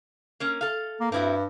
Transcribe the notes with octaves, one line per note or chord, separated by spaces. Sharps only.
A#3 C#4
A4 F5
A#3
G2 C4 E4 F#4